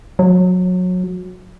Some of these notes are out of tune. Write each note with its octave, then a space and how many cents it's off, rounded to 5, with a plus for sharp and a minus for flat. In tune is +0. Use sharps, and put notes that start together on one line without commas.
F#3 -25